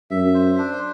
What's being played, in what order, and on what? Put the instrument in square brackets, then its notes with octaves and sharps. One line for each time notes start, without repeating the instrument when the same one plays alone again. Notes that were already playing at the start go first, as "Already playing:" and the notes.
[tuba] F#2 [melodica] E5
[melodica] C5
D4